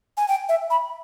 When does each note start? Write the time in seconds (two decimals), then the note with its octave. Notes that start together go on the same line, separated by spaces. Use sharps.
0.17 G#5
0.28 G5
0.49 E5
0.70 B5